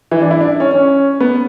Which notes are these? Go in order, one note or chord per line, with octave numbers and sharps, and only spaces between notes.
E3
D4
E4
D4
C#4
C#4
B3